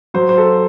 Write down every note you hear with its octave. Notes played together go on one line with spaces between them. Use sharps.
F#3 C5
C5
A4